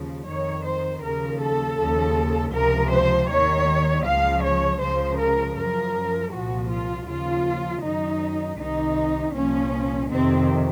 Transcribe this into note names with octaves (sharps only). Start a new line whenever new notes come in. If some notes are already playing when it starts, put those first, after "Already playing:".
Already playing: D#2 C#3 F3
F2 D#3 C#5
C5
D#2 C#3 F3 A#4
A4
D#2 C#3 F3
C#2 C3 F3 A#4
C5
D#2 D#3 C#5
C#2 C#3 F3 F5
C#5
C#2 C#3 F3 C5
A#4
F#2 F3 A#4
C2 A#2 F3 F#4
F4
D#2 C#3 F3 F4
F#2 D#3 D#4
C2 C3 D#3 D#4
C2 A#2 F3 C#4
F2 C3 D#3 C4